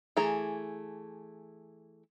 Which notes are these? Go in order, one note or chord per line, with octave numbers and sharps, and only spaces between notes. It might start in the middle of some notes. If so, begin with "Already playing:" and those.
E3 A3 G#4 A#5